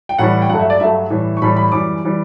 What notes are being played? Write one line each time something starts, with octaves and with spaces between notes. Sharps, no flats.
G5
A2 E3 G3 F#5
G5
G2 F#3 A3 F#5
E5
D5
G2 F#3 A3 E5
A2 E3 G3
C#6
A2 E3 G3 B5
B5
F#2 E3 G3 D6
E3 G3